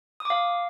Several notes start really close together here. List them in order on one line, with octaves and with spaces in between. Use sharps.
D#6 D6 F5